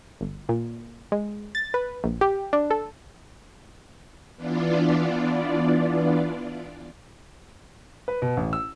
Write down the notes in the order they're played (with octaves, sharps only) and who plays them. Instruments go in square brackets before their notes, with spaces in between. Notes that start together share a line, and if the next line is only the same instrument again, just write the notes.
[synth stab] G1
A#2
G#3
A6
B4
A#1
G4
D4
A4
[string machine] E3 B3 D4 F4 D5
[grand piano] B4
B2
A1
E6